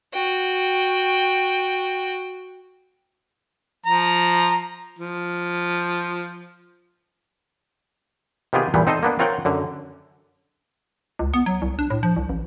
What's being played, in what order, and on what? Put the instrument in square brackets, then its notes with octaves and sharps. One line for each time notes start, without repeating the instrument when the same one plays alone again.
[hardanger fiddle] F#4 G5
[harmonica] F3 A#5
F3
[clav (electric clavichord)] C3 D#3 B3 F4 G4 G#4
E2 A#2 E3 G3 B3
C4 D#4 A4 C5 D#5
A#3 B3 D4
C4 F4 A#4 C#5 F#5 G5
F#2 D3
[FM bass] C#2
B3
F#3
C2
D4
A2
F3
C2
A1